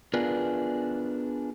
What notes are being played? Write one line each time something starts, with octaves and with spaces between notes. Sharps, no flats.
B3 D4 F4 G#4 A#4 B4